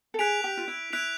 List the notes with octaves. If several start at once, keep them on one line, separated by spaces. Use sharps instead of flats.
A4
G#4 F#6 B6 D7 F7
G4
F4
E4
E4 F#6 B6 D7 F7